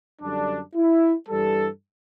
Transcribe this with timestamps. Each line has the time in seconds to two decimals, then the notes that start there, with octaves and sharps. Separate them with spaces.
0.21 F#2 D3 G3 D4
0.75 E4
1.29 G2 E3 G3 A4